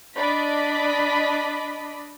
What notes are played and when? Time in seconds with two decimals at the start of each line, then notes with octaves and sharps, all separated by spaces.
0.16 D4 D5 D#5 B5 B6